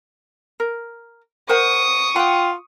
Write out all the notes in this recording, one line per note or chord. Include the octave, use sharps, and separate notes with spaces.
A#4
A#4 C5 F#5 C#6 D#6
F4 F#5 G5